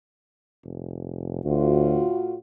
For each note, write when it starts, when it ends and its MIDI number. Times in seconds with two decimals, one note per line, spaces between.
0.64 1.40 29
1.45 2.03 38
1.45 2.36 45
1.45 2.36 65
1.45 2.36 66